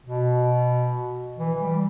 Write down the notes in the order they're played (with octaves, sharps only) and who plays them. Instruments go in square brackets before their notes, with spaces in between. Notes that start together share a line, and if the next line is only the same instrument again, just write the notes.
[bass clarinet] B2
E3
G3